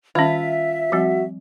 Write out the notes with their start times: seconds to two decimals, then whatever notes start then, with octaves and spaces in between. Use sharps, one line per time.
0.15 D#3 G3 C#4 F4 E5
0.92 F3 G3 C4 F#4